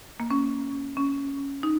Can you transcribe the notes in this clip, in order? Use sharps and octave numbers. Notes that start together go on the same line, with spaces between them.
A#3
C#4
C#4
D#4